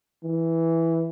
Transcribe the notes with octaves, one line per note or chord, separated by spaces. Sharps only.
E3